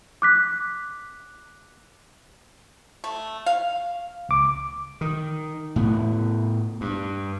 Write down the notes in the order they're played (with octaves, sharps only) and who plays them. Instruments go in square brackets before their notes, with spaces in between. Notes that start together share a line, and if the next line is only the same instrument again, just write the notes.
[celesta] D6 F#6 B6
[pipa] A3
F5
[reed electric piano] C#2 D6
[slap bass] D#3
A2 B3
G2